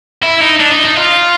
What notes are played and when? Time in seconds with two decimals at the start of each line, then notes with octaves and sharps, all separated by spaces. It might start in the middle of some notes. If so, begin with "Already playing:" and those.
0.23 E4
0.41 D#4
0.61 D4
0.72 D#4
0.85 D#4
0.97 F4